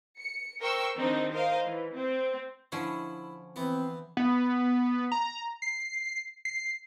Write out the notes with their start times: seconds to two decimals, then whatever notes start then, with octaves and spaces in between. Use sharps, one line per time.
0.18 C#7
0.60 A#4 C5 G5 C#6 E6
0.96 D#3 C4 D4 D#4
1.31 A#4 C5 D#5 F5
1.65 E3
1.94 C4
2.72 D3 F3 C#4 E4
3.56 E3 B3 C4
4.17 B3
5.12 A#5
5.62 C7
6.45 C7